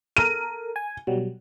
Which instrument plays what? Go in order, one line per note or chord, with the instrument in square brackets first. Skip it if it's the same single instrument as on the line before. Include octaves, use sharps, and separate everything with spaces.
[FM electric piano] A4 A#4 [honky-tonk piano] D#7
[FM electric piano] G#5
B2 F#3 G3